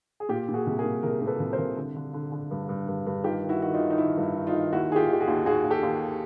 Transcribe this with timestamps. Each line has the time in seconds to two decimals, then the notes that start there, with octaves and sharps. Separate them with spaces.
0.20 G#4
0.29 A#2 F4 G4
0.48 A#2
0.54 F#4 G#4
0.66 C2
0.78 G#4 A#4
0.84 A#2
1.03 C2 G#4 A#4
1.20 A#2 A#4
1.27 A4 B4
1.40 C2
1.53 A#4 C5
1.58 C2
1.77 D3
1.96 D3
2.14 D3
2.32 D3
2.51 G2
2.69 G2
2.88 G2
3.06 G2
3.24 D#3 F4 G4
3.43 D#3
3.49 E4 F#4
3.61 D#3 F#4
3.74 D#4 F4
3.79 D#3
3.90 D#4
3.98 D#3 E4
4.17 G2
4.23 E4
4.35 D#3
4.47 D#4 F4
4.54 D#3
4.72 D#2 E4 F#4
4.90 D#3 G#4
4.96 F4 G4
5.08 D#3 G4
5.20 F#4 G#4
5.27 D#2
5.46 D#2 F#4 G#4
5.64 D#2
5.70 G4 A4
5.83 D#2